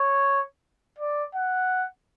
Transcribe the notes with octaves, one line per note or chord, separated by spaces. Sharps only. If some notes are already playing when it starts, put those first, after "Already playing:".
Already playing: C#5
D5
F#5